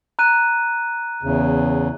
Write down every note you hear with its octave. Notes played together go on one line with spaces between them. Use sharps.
A#5 F#6 D#7
E2 C#3